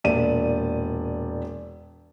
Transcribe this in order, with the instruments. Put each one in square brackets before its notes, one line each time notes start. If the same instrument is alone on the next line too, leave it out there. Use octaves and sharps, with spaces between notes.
[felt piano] E1 A#2 D5 D#7